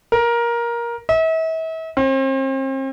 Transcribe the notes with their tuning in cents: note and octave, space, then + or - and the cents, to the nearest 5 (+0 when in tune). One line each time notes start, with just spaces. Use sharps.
A#4 +15
E5 -40
C4 +40